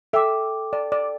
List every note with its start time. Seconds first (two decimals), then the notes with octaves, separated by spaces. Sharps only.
0.13 A4 E5 G5 D6
0.73 D5
0.92 D5